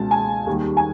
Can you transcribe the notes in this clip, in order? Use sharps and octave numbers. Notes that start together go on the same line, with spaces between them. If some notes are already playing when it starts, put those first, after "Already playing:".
Already playing: C#2 B2 G#3 A5
G#5
D#2 D#3 G3
G#5